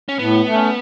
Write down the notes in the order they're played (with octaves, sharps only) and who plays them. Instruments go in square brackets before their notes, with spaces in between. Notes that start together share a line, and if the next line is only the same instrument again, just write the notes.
[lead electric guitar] C#4
[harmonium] A2 [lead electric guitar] B3
[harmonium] A3
C#4